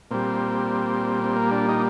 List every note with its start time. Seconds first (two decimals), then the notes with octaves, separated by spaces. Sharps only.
0.11 A#2 G3 C4
1.24 C4
1.36 A#3
1.51 D4
1.68 D#4